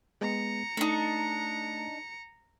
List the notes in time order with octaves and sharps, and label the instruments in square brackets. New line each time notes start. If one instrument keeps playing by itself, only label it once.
[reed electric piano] G#3 B3 [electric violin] A#5 C#7
[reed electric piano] A3 [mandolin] D4 D#4